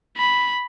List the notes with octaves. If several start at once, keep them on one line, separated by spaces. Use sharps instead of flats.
B5